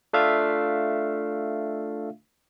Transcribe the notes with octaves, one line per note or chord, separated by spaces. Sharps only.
A3 D4 F4 E5 F5